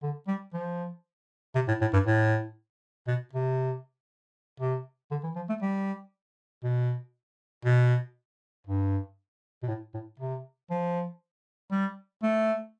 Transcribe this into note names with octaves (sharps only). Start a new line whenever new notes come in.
D3
G3
F3
C3
A2
A2
G2
A2
B2
C3
C3
D3
E3
F3
A3
G3
B2
B2
G2
B2
A2
A2
C3
F3
G3
A3